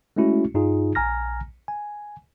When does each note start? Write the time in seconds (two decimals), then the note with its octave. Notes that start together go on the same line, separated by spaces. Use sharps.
0.16 G#3 A3 C#4 E4 F#4
0.54 G2 D#4 F4 G#4
0.95 A#1 G#5 A#5 F6 A#6
1.68 G#5